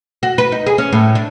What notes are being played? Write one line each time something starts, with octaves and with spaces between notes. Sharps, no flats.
F#4
B4
D#4
G#4
C#4
A2
D4